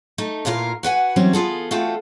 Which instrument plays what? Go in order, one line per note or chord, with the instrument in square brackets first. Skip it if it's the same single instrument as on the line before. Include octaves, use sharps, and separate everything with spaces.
[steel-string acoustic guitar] A3 D#4
A#2 E3 F4 A#4 F5
F#4 B4 F#5 G#5
E3 F#3 G3 C4 C#4
B3 F4 G#4 A4
A3 B3 C4 F4 F#4 A4